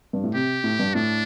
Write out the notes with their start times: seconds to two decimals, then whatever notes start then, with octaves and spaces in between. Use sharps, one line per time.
0.13 G2
0.23 A2
0.34 C3 G4
0.64 A2
0.79 G2
0.94 A2 D4